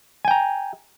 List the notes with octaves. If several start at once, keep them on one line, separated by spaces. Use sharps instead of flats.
G5 G#5 A#5